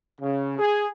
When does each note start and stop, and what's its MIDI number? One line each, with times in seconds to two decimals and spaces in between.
0.21 0.58 49
0.59 0.89 68